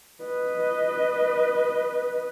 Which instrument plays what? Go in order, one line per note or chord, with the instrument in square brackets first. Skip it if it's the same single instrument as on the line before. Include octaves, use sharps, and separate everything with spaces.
[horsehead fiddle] B4 D#5